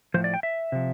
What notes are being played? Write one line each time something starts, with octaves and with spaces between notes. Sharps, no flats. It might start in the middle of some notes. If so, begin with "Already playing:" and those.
A2 F3 C5
D5
G5
E5
C3 F3